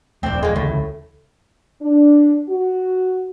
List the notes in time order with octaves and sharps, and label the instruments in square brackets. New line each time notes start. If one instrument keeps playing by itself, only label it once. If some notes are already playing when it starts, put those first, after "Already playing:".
[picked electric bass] D#1 F2 A3 [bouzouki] C4 D4
[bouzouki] G#3 A#3
[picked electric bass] D2 C#3 E3 [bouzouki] A2
[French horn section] D4
F#4